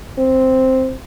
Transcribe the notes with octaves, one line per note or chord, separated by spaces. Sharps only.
C4